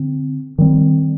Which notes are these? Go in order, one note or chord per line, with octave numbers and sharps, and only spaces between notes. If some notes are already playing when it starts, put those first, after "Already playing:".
Already playing: D3 C4
D#3 G3 C4